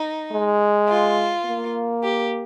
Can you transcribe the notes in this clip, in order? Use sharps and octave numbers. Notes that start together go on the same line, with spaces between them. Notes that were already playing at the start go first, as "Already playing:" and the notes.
Already playing: D#4
G#3
F4
A#3
G4